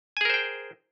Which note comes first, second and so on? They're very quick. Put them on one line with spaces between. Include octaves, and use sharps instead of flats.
G#5 G#4 A#4 C5 G5